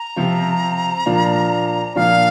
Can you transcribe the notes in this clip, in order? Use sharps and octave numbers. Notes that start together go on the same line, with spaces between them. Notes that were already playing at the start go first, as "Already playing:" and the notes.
Already playing: A#5
C3 F3 C4 F4
A#2 F3 D4 F4
A#2 F3 D4 F4 F5